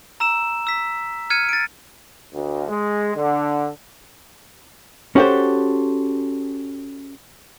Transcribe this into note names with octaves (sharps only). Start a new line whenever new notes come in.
A#5 E6 E7
E6 B6
F6 G#6 C#7 D#7
A6 D7
D2
G#3
D3
C#4 F#4 G4 A4 C5